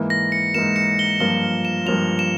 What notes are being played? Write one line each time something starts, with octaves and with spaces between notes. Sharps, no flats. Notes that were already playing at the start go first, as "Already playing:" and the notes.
Already playing: G#2 E3 A#3
A#6
C#7
G#2 E3 A#3 E7
C#7
G7
G2 F3 A#3 F4 G7
E7
G2 F3 A#3 F4 F7
E7